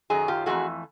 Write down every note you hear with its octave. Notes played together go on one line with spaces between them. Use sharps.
F#2 D#3 F#3 G#4
F4 G4
F2 C3 E3 A3 F#4 G#4